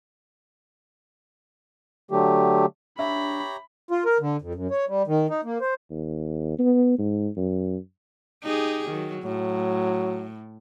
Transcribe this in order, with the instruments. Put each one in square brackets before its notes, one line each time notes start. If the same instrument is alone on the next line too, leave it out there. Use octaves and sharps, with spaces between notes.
[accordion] D3 F#3 A3 G4
[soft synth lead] D4 [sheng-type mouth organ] G4 C#5 A#5 [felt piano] E5 [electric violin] B5
[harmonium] F4
A#4
D3
F2
F#2
C#5
G3
D#3
D#4
A#3
C5
[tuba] D#2
B3
G#2
F#2
[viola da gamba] D#4 G4 G#4
D#3 F#3
[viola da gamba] A2 [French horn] F#3